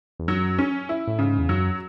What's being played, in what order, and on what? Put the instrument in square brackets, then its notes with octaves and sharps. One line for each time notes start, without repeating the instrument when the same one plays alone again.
[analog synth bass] E2
[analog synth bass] F#2 [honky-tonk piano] F#3
[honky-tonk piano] C#4
E4
[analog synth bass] A2
[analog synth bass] G#2 [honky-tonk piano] C#3
[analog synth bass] E2
[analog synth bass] F#2 [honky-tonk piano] F#3